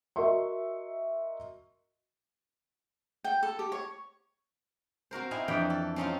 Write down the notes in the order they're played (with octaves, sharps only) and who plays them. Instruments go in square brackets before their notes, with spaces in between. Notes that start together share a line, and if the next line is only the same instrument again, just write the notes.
[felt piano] F#4 A#4 D#5 E5 C6 C#6
[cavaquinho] G5
A4
G4
C#5
[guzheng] C4 F#4 A#4 C5
C4 D#4 E4 D#5 F5 G#5
F2 E3 D4 B4 G5
A4
C4 C#4 D#4 F4